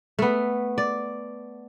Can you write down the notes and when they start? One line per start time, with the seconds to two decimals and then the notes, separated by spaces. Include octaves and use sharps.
0.19 A3 B3
0.78 D5